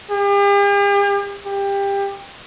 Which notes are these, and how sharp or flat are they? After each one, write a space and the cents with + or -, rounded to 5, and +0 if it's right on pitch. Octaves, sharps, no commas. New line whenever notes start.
G4 +45
G4 +20